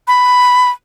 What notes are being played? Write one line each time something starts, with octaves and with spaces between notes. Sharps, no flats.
B5